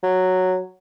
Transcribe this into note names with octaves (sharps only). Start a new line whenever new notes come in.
F#3